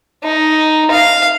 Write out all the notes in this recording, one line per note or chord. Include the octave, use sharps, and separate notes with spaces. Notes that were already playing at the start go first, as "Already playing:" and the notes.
D#4
F5